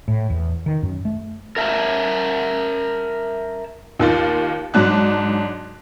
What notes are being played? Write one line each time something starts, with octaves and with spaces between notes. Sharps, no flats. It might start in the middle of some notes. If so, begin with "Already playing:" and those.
A2
E2
D#3
F#2
A3
A#4 E5 A5
D#2 D#3 F4 A6
G#2 F#3 D4 F#6